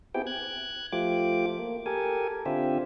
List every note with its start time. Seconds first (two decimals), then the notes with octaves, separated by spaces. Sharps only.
0.14 B3 C4 E4 G4 G#4 G5
0.27 F#6 G#6
0.92 F3 A3 F4 G4 D6
1.59 A#3
1.86 G4 A4 A#4 G#5
2.46 D3 C4 F4 G4 E5